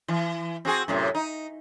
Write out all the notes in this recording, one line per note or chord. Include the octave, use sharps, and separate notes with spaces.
E3
C4 F#4 G#4
F#2 A2 C3
D#4